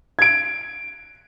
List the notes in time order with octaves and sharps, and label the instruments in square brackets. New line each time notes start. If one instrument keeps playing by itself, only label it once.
[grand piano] G#6 D7